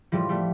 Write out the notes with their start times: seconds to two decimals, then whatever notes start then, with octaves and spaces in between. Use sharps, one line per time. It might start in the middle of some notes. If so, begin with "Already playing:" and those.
0.12 A2 E3 F3 G3
0.29 G3 A3